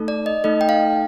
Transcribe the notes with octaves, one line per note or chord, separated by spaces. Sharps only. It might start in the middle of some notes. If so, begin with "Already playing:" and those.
Already playing: A3 D#4 A4
D5
D#5
A3 D#4 A4 D#5
G5
F5